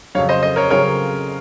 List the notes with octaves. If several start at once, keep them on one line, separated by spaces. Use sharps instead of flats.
F2 C#3 F#3 C#5 F5
C5 D#5
C5 D#5
A#4 C#5
C#3 F#3 C4 F4 G#4 A#4 C#5